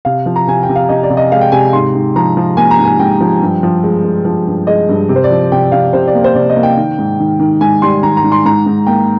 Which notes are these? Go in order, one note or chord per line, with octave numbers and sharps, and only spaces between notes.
C3 F5
F3
A#5
C3 G#5
G5
C3
F5
C3 D#5
D5
C3
D#5
G#3 F5
G5
C3 G#5
G#2 C6
G#2
F3 A#5
F3
A#3 G#5
A#5
G#2
G#5
G#2 G5
F3
G2
F3
G#3
G#3
F3
G2
G#3 D#5
G2
C3
C5
D5
F3
C3 G5
C3 F5
C3 C5
D5
A#3
C5
C3 D5
D#5
A#3
G5
D#3
G#2
D#3
D#3
G#2 G#5
G3 C6
D#3 A#5
A#5
G#2
C6
G#2 A#5
G#2
A#3 G5